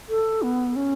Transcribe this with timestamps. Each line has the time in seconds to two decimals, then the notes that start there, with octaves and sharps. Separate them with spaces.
0.09 A4
0.42 B3
0.76 C#4